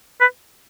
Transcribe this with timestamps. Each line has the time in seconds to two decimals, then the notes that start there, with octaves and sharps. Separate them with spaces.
0.21 B4